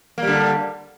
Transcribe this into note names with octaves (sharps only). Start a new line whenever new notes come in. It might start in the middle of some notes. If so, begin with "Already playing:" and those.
D3 G3 A#3